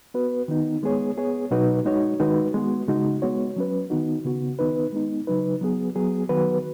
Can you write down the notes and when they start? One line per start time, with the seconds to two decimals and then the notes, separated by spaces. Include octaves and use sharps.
0.14 B3 F#4 B4
0.48 D#3 B3 D#4
0.83 G#3 B3 G#4 C#5
1.17 B3 G#4 C#5
1.51 B2 F#3 D#4 F#4 B4
1.85 G#3 D#4 F#4 C#5
2.20 D#3 G#3 D#4 F#4 B4
2.54 G#3 B3 F#4
2.88 C#3 G#3 D#4 F#4
3.22 G#3 B3 F#4 C#5
3.56 F#3 C#4 B4
3.90 D#3 B3 D#4 F#4
4.24 C#3 B3 F#4
4.59 D#3 B3 D#4 B4
4.93 G#3 B3 D#4
5.27 C#3 F#3 D#4 B4
5.61 F#3 B3 G#4
5.95 F#3 B3 G#4
6.29 D#3 F#3 B3 F#4 B4